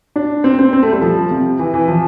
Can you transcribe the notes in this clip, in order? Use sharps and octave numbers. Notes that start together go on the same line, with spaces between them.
D4
C4
C4
C4
A3
G3
F3
C3
E3
E3
F3